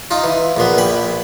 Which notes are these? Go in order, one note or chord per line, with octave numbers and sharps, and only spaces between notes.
D#4 F4
E3
A#1 A#2 B3
A#1 G5 B5